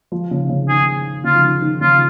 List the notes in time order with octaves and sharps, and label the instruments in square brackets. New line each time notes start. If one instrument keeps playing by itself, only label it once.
[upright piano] F3
C#3
C#3
[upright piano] D#3 [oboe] G#4
[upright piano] C#3 [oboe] F4
[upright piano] F3
D#3
D#3
[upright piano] C#3 [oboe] F4